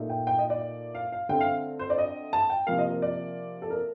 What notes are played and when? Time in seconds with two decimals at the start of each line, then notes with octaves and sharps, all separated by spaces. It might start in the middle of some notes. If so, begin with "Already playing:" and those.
Already playing: A#2 A3 D#4
0.09 G5
0.27 G5
0.38 D#5
0.50 D5
0.95 F5
1.12 F5
1.29 D3 A3 C4 G5
1.41 F5
1.79 C5
1.90 D5
1.98 D#5
2.33 A5
2.50 G5
2.67 C3 F3 A#3 F5
2.78 D#5
2.90 A#4
3.02 D5
3.62 A4
3.70 A#4